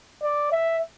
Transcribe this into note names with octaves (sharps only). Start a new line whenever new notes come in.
D5
E5